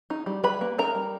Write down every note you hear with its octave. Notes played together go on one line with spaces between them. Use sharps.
D#4
G3
G3 B4 B5
A#3
D#4 A#4 A#5
G3